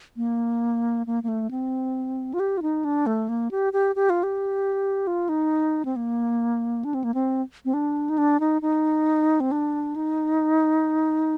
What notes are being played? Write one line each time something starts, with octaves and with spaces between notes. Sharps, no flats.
A#3
A#3
A#3
A3
C4
F4
G4
F4
D#4
D4
A3
A#3
G4
G4
G4
F4
G4
F4
D#4
C4
A#3
D4
C4
A#3
C4
C4
D4
D#4
D4
D#4
D#4
C4
D4
D#4